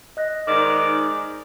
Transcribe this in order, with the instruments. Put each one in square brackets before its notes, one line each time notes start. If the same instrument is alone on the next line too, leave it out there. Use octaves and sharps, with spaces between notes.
[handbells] D#5 F#6 A#6
[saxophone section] G#2 D#3 D5 [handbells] D6